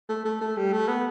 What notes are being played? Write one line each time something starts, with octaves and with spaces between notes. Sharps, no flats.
A3
A3
A3
G3
A3
B3